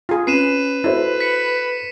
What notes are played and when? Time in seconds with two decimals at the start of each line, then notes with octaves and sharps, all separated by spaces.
0.09 F4 G#4
0.27 C#4 B4 C7 D#7 E7
0.84 E4 F#4 A4 C5
1.21 B6 C#7